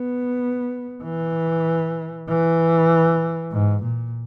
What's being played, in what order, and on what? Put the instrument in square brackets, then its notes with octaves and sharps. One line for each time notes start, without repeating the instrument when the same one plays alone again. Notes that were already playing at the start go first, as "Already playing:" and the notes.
Already playing: [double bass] B3
E3
E3
G#2
A#2